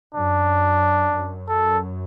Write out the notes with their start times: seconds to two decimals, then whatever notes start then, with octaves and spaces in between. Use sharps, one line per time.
0.14 F#2 D4
1.15 F#2
1.48 A4